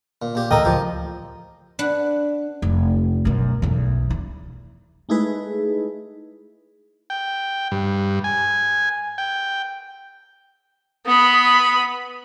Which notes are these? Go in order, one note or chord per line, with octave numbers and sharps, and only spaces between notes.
A#2
A#2 G4
D2 A2 E3 A4 A#4 D#5 G5 A#5
C#2 F3 G4
D4 B4 F#5
F1
F#2 B2
B1 E2
E4
G#3 A3 D#4 E4 G#4 B4
G5
G2
G#5
G5
B3 B5 D#6